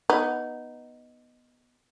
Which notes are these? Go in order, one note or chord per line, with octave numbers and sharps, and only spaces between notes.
B3 D#4